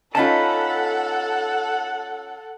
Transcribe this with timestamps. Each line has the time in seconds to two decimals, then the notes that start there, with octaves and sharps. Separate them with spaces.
0.15 C#4 D#4 F4 A4 F#5 A5 B5